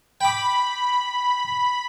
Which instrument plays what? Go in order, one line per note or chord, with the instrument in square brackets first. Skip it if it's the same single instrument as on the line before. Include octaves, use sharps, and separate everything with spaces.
[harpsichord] G5 D6 [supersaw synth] B5